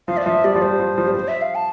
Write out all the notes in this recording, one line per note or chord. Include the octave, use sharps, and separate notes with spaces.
F3 F5
D5
F3 E5
G3 D5
F3
G3 C5
F3
F3
G3
F3 C5
E5
F5
A5